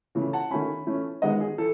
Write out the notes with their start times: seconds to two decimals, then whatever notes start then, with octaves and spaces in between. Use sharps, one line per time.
0.15 C#3 E3 A3
0.33 F#5 A5
0.51 D#3 A3 C#4 G#5 B5
0.87 E3 A3 C#4
1.22 D#3 G#3 B3 D#5 F#5
1.40 G#4
1.58 E3 A4